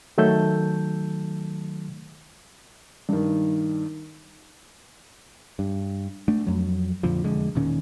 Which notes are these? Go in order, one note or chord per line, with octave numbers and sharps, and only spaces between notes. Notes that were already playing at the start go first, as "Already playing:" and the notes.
D#3 F#3 A3 A5 E6 G6
G2 D#3
G2
A3 D4
F2 F#3
F2 A#2 D3 F3
E1 F2 D3 G#3
E1 A#2 D#3 C#4